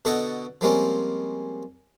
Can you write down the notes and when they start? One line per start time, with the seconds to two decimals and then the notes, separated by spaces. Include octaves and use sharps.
0.05 B2 D3 F#4 A4 D#5 C#6
0.61 F3 G3 G#3 A#3 C4 C#4